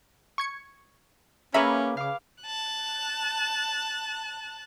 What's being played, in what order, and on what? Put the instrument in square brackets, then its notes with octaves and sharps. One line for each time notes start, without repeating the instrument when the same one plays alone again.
[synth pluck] C#6 G#6 C#7
[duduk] A#3 [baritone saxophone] C#4 [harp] G#4 B4 D6 [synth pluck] E5 A#5 B5
[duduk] C#3 [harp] F5 D6
[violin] A5 F#6